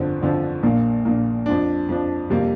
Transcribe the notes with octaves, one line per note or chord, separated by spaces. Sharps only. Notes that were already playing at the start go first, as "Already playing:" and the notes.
Already playing: G1 F2 D3 F3 C4
G1 F2 D3 F3 C4
A#1 A#2 A#3
A#1 A#2 A#3
F2 F3 D4
F2 F3 D4
F2 C3 G3 A#3